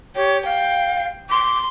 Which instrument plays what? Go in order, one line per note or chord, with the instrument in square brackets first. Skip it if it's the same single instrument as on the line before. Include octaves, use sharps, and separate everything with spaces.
[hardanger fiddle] G4 [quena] C#5
[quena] F5 [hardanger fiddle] G5
[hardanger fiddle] C6 [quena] D6